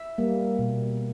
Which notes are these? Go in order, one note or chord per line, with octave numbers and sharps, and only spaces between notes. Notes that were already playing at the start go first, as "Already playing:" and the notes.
Already playing: E5
G3 A#3
B2